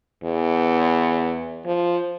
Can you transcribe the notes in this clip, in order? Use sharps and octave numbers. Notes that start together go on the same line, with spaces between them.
E2
F3